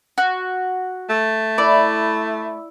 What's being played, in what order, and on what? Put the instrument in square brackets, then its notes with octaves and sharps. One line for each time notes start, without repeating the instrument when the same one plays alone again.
[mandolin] F#4
[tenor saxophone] A3
[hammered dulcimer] E4 [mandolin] D5